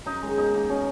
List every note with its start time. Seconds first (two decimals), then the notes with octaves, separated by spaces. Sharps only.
0.06 F#2 D#4
0.22 D#3 G#3
0.38 B2 D#4
0.54 A#3 D#4
0.69 B2 C#4